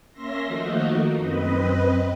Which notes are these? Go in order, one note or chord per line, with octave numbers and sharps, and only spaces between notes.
A#3 C#4 E5 C6 A#6
D#3 F3 A3 A#3 D#4 F#4
F#2 C4 B4 D#5